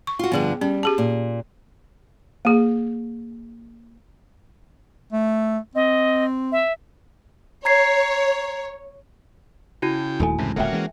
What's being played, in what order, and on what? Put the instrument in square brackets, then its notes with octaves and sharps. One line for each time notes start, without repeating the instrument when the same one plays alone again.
[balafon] C#6
[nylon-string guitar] F4 F#4
[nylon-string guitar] G2 D3 F3 [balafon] B3 G#4
[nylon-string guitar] G3 [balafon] C#4
[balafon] G4 G#4 A5
[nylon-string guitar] A#2
[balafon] A#3 G#4
[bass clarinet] A3
[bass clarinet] C4 [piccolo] D#5
[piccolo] E5
[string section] C#5 [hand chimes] A#5 G#6 C7
[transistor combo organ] C#3 G5 [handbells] E4 F#4
[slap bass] D#1 D#2 A3 [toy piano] D#4 A4 G#5
[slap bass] C#2 F#2 [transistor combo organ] A2 C3 E3 [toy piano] A5
[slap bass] D1 C#2 [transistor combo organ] A#3 C#4 F#4 [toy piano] A4 E5 G5
[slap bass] E3 G#3